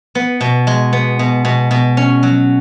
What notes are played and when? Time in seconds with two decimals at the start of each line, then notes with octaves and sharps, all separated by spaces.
0.15 B3
0.41 B2
0.67 G#3
0.93 B3
1.19 B2
1.45 B2
1.71 B2
1.97 C#4
2.23 F#3